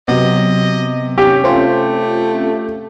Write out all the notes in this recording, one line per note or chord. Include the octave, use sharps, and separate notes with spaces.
C3 F#3 B3 D#5
C#4 G4
A3 C4 C#4 F4